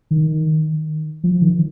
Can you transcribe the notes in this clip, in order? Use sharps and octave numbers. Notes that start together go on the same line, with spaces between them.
D#3
F3
D#3